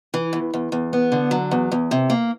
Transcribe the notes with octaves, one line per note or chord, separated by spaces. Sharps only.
E3
E2
E2
E2
B3
D3
F#3
E2
E2
C3
A#3